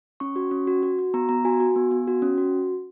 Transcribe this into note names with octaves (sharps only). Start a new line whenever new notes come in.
C#4 C#6
F#4
C#4
F#4
F#4
F#4
B3 A#5
B3 A#5
F#4 G#5
F#4
B3
B3
F#4
C#4
F#4